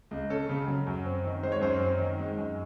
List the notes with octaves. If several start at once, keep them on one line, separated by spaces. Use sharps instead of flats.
C#2
C#4 A4
C#3
F#3
F#2
C4
D#3
G#3 C5
C#5
F#2 C5
C4
D#3
G#3
F#2